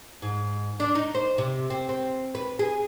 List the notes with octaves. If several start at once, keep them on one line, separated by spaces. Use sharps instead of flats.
G#2
D4
D#4
C5
C3
C4
C4
B4
G#4